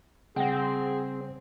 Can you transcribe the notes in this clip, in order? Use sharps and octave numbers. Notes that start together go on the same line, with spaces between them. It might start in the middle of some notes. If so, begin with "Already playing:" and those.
C#3 G3 C4 G#4 F#5 G5 A#6